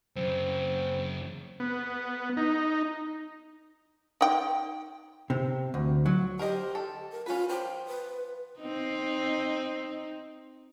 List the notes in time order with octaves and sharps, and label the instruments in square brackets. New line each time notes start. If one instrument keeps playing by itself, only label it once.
[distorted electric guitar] F#2 C#3 [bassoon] C4
[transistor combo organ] B3
D#4
[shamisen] D#4 G5
[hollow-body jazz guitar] C3
D2
F#3
[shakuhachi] G4 [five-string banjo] A#4 C5 D#5
[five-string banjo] A4
[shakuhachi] A#4
[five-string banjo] C#4 B4 [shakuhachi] F4
[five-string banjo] F3 [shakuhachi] G5
[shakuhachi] B4
[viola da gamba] C4 D#4